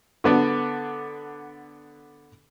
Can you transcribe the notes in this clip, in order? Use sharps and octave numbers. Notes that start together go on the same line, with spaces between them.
D3 B3 D4